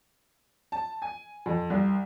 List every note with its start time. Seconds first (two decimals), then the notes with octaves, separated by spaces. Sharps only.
0.72 A5
1.02 G#5
1.46 F2
1.70 C2